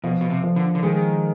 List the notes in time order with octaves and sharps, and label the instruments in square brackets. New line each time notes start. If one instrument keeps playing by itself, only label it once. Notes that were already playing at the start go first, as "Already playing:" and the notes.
[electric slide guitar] B2 [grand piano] F3
[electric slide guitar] B2
C3
[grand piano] F3
[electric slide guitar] D3
D3
[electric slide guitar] D#3 [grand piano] G#3